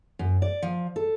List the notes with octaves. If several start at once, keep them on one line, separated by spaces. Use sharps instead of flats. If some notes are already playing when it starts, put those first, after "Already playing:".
F#2
D5
F3
A4